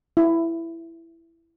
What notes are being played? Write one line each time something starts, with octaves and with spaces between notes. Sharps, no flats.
E4